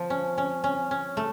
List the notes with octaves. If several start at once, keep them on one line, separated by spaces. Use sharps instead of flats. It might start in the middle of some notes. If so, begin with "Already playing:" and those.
Already playing: F3
C#4
C#4
C#4
C#4
A3